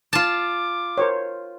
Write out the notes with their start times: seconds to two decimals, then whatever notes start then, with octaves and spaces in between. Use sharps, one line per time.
0.13 F4 A5 D6
0.98 A#4 C5 C#5